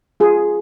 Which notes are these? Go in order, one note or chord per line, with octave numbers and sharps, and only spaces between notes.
F4 G#4